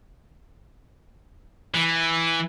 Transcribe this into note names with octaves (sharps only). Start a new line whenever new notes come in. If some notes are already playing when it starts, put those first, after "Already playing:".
E3